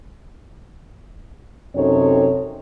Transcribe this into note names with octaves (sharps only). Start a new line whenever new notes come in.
F#2 C3 C4 D#4 A4 C#5